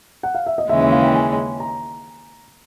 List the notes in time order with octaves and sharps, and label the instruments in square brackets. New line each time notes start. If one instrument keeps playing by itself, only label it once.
[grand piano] F#5
F5
E5
D#5
[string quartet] D#2 C#3 E3 G#3 C#4 [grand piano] E5
[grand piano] E5
F5
G5
G#5
A#5